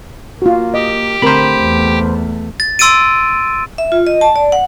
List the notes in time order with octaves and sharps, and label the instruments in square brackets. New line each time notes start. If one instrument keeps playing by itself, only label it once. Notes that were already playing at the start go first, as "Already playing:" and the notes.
[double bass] A#3 [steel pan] F4 F#4
[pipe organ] G4 G5 [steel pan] D#5
[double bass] D3 A3 [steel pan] C4 A#4 [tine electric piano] C5 B5
[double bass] E2 A3
[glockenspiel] A6
C6 E6 A6 D7 D#7
[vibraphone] E5
F4
D#5
A5
D5
F#5